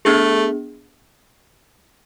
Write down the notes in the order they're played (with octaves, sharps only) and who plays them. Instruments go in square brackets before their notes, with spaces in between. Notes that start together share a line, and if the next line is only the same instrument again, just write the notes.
[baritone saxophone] A3 [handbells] B3 D4 G#4